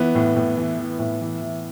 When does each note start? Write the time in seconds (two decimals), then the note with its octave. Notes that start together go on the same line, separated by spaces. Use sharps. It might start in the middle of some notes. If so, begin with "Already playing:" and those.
Already playing: E3 B3
0.15 A2
0.36 A2
0.56 E3
0.79 E3
0.99 A2
1.21 E3
1.42 E3